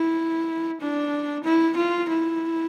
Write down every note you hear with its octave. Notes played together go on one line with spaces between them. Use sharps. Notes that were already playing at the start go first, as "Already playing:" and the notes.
Already playing: E4
D4
E4
F4
E4